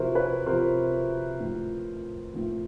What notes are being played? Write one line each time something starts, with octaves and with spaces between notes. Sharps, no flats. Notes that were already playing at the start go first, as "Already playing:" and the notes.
Already playing: C3 F3 E4 F#4 A#4 C5
B4 C#5
C3 F3 A#4 C5
A2 F3
A2 F3